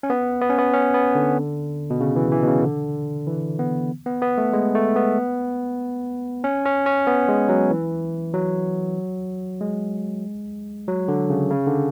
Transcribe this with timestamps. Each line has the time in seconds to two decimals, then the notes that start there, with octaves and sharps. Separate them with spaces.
0.03 C#4
0.10 B3
0.41 B3
0.50 C#4
0.58 B3
0.74 C#4
0.94 B3
1.15 D3
1.90 B2
2.00 C#3
2.16 E3
2.32 E3
2.43 B2
2.47 C#3
2.63 D3
3.27 E3
3.59 B3
4.06 B3
4.22 B3
4.38 A3
4.53 G#3
4.75 A3
4.96 B3
6.44 C#4
6.65 C#4
6.86 C#4
7.07 B3
7.29 G#3
7.49 F#3
7.71 E3
8.34 F#3
9.61 G#3
10.88 F#3
11.08 D3
11.30 C#3
11.51 C#3
11.67 D3